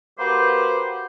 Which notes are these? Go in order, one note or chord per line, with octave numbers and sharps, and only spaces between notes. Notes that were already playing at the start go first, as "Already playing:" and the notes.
A#3 F#4 G4 B4 C5